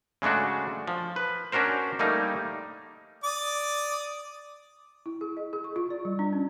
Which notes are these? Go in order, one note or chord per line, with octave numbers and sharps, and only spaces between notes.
C#3 G#3 A3 D4 F#4
F3
B4
C#4 D4 F#4 A#4 C5
G3 A3 A#3 D#4
D5 D6 D#6
E4
G#4
D#5
G#4
C#6
F4
D5
G3
D4
C#4